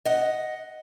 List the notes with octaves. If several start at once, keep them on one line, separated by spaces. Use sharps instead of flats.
D#5 F#5